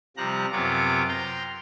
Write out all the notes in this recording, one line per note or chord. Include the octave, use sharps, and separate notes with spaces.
C3 F3 G3 A#5 F#6
F#2 C3 B3 F4 C#5 D6
G5 A#5 C6